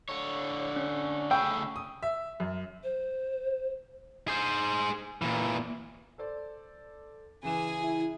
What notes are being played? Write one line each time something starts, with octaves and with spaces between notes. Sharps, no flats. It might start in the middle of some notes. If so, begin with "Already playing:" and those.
D3 C#5
C#4
C#3 A3 G#4 G5 B5 C#6 E6
D#6
E5
F#2
C5
G#4 C5
A#2 E3
A4 C5 D5
C#3 E3 G#4 G#5 E7
E4